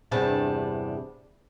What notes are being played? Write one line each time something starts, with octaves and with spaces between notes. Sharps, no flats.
E2 G2 C3 G3 D4 A5